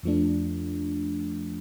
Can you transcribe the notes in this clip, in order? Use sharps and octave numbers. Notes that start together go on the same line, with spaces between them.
F2 F3 A3 D4